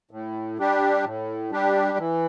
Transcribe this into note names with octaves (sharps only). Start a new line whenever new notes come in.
A2
G3 D4 G4
A2
G3 D4 G4
E3